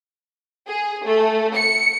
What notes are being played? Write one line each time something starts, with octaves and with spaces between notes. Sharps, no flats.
G#4
A3
C#7